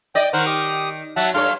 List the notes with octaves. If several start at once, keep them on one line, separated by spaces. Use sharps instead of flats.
D5 D#5 G5
D#3 A#4 C5 F#5
G4 D#6
F#3 E5 F#5 A5
G2 A4 C#5 F5 C6